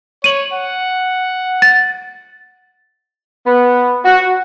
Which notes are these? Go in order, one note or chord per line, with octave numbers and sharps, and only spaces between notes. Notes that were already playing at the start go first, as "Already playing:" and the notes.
C#5 D#7 F#7
F#5
A6
B3
F#4